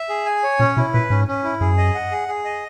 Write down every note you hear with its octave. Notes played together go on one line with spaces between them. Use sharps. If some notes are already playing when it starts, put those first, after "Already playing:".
Already playing: E5
G#4
G#5
C#5
A#2 C#4
B2 E4
A#2 B4
G#2 C#4
C#4
E4
F#2 G#4
D#5
F#5
G#4
G#4
D#5